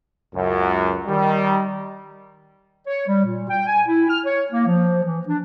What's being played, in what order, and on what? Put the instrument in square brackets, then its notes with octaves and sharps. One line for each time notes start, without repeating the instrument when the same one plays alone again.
[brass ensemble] C#2 F#2
D#3 G3
[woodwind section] C#5
G3
A#2
G5
G#5
E4
F6
C#5
A#3
F3
E3
D4